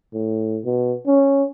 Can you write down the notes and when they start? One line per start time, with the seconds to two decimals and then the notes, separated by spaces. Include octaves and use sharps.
0.14 A2
0.65 B2
1.07 C#4